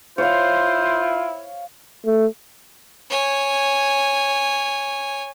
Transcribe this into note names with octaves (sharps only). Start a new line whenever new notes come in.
E4 F4 C5 C#5 F5
A3
C#5 G#5